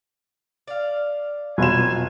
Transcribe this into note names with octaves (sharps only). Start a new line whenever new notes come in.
D5 F5
F1 B2 F#3 F4 G#5 E7